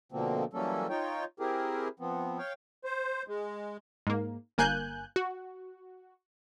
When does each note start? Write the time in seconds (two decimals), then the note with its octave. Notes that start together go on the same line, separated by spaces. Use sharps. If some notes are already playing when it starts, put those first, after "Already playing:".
0.12 B2 D3 F3 A#3 C4
0.53 E3 F#3 G3 A#3 C#4 A4
0.90 D#4 F4 C#5 G5
1.40 C4 E4 G4 G#4 A#4
2.00 F3 B3 C4
2.38 C#5 F5 G5
2.84 C5
3.28 G#3
4.07 G#2 A#3
4.58 G1 A#3 G#5 F#6 G6
5.16 F#4